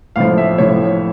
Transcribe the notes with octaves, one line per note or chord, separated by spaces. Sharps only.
A1 A2 F3 F5
E5
A1 A2 F3 C#5